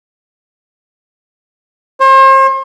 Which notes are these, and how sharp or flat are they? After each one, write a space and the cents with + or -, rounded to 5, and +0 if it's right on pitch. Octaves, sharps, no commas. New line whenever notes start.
C5 +40